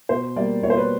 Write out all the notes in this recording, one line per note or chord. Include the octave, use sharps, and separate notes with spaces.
B2 C5
G3 A#3 D5
B2 C#5
C5
B4